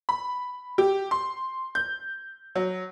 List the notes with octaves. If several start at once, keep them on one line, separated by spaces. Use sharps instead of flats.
B5
G4
C6
G6
F#3